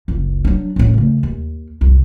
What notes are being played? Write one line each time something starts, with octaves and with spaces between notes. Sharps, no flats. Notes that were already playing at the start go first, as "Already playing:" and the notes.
F#1 C#2
F#3 D4
A2 C#4
C#3 A3
D#2
C2 F2